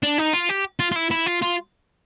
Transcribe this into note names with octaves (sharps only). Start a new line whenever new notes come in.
D4
D#4
F4
G4
F4
F4
E4
E4
F4
F4